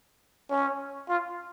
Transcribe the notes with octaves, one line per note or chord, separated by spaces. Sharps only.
C#4
F4